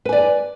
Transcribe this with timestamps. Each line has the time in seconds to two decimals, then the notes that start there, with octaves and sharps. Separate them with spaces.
0.05 B4
0.09 G#5
0.12 D5